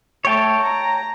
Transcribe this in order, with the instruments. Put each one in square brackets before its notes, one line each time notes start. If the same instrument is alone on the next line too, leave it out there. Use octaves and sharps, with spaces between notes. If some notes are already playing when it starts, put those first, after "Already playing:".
[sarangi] A3 [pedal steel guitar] C#5 G5 A5
[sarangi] A#5